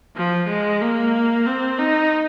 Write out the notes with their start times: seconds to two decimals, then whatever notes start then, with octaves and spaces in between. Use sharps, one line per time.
0.17 F3
0.49 G#3
0.81 A#3
1.46 C4
1.79 D#4